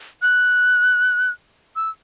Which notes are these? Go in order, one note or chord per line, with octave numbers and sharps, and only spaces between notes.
F#6
E6